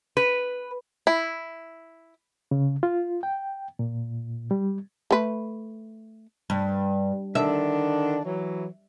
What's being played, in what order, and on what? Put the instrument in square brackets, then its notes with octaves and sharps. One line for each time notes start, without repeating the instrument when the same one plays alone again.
[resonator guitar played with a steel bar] B4
[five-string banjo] E4
[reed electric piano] C#3
F4
G5
A#2
G3
[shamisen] A3 B4
[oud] G2
[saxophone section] D3 D#3 D4 [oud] E5
[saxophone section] E3 F#3